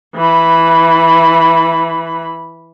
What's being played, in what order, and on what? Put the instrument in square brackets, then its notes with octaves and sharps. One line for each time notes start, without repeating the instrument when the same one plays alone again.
[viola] E3 B5